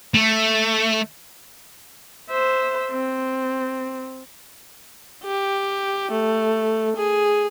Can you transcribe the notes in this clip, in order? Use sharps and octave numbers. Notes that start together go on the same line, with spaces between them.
A3
C5 E5
C4
G4
A3
G#4